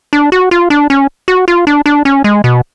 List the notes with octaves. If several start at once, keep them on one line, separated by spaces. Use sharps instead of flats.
D4
F#4
F4
D4
C#4
F#4
F4
D4
D4
C#4
G#3
B2